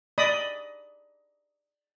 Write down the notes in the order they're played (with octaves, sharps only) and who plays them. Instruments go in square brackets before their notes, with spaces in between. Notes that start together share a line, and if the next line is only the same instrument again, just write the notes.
[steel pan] D5 D#5 B5 D#6